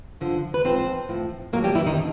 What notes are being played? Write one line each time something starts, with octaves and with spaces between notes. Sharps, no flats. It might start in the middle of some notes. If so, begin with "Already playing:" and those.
G2 D3 F3
B4
G#2 F3 C4 C5
A2 F3
A2 F#3 A#3 A#4
G3 G4
E3 E4
D#3 D#4
D3